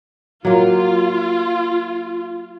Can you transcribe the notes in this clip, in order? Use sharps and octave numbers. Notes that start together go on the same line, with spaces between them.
F#3 A#3 F4